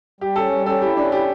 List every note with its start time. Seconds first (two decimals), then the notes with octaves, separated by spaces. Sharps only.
0.21 G3 G4
0.36 C#4 A4
0.51 G3
0.66 C#4 A4
0.82 E4 G4
0.97 C#4 D4
1.12 E4 G4